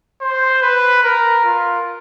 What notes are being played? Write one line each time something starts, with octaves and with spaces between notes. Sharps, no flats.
C5
B4
A#4
F4